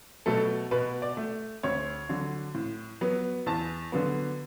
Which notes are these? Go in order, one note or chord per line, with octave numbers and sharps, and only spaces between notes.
B2 F#3 A3 A4
B2 B4
D5
A3
D2 C#5
D3 F#3
A2
F#3 B3
E2 A5
D3 F#3 B3